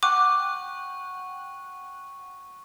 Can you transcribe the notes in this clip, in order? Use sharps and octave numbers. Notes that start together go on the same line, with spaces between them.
F#5 G5 C#6 D6 F#6